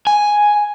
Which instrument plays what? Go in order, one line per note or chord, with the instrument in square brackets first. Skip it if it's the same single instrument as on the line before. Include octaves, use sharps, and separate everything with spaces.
[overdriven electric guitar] G#5